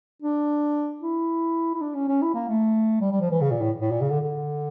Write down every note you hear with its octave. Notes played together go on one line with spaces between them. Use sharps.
D4
E4
E4
D4
C#4
C#4
E4
A#3
A3
G3
G3
F3
E3
C#3
A#2
A2
A2
A#2
C#3
D3
D3